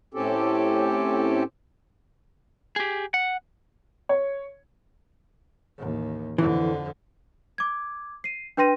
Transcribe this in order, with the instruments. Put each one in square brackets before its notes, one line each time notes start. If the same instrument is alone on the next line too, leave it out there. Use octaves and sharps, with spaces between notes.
[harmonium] A2 C4 C#4 G4 A4
[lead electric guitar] G4 G#4
F#5
[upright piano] C#5
[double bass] A1 D#2
[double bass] F2 D3 [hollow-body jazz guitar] E3
[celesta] D6 G#6
C7 D#7
D4 B4 G5 C6 A#6 D#7